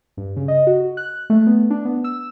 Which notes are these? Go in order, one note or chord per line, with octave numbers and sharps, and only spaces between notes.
G2
C#3
D#5
F#4
F#6
A3
B3
D4
B3
E6